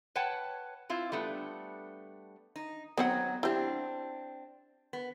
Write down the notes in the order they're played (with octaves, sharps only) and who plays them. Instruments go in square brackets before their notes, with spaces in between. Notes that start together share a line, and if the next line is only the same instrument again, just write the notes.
[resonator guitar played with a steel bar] B4 C#5 F#5 G5 A5
C4 E4 F4
G3 A3 B3 D4
D#4
[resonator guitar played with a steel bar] F#3 D#4 [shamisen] B3 C4 F#5
[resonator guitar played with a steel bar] C4 D4 [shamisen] E4 G4
[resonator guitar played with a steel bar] B3